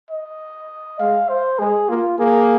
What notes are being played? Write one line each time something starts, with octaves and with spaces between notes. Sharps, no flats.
D#5
G#3 F5
C5
G#3 G#4
A#3 F4
A#3 G#4